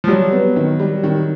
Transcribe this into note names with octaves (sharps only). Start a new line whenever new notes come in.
F3
F#3 G3
B3
D#3
G3
D#3